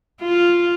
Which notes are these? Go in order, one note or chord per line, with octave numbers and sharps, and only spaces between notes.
F4